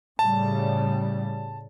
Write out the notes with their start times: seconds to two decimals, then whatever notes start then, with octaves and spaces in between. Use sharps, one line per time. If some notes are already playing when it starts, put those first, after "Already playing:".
0.19 A2 C#3 G3 A5